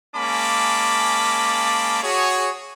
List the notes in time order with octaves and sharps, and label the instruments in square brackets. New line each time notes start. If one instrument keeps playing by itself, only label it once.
[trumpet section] G#3 A#3 C#4 A5 B5 D6
F#4 G#4 C#5